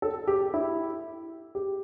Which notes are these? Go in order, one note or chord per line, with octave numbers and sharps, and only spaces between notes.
A4
G4
E4
G4